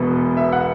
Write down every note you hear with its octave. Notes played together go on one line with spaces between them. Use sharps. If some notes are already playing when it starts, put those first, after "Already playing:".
Already playing: E1 E2 B2
E5
F#5